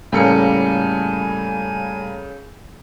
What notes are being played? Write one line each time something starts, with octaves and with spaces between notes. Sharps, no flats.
A2 C#3 G3 A#3 A4 G#5 C#7